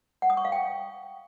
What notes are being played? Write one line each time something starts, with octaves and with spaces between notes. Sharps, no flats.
F#5
D#6
C#6
F5
G5